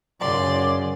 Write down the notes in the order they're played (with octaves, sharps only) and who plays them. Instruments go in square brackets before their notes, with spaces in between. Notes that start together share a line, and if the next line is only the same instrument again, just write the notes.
[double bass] F#2 C#3 [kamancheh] D5 C6